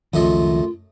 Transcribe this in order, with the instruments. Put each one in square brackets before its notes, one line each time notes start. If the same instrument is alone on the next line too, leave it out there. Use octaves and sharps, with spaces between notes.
[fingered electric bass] C#2 D#3 F3 [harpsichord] F#2 A3 D#5 [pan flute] F4